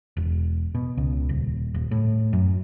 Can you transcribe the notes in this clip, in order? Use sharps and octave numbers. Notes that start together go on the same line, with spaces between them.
E1
B2
C#2
D#1
D#1
A2
F#2